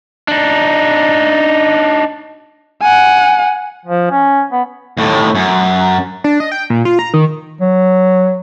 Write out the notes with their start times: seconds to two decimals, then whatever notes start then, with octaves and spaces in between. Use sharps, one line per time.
0.28 D4 D#4
2.82 F#5 G#5
3.85 F3
4.11 C#4
4.52 B3
4.97 D#2 A2
5.35 F#2
6.24 D4
6.40 D#5
6.52 G5
6.70 A#2
6.85 F4
6.99 A#5
7.14 D#3
7.61 F#3